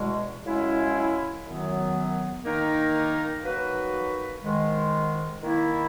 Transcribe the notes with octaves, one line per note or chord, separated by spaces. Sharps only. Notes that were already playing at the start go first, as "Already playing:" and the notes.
Already playing: E2 B2 G#3
F#2 C#3 G#3 C#4 E4
F#2 D#3 F#3 B3
D#3 A#3 D#4 A#4
F#3 A#3 D#4 F#4 B4
G#2 D#3 G#3
D#3 A#3 E4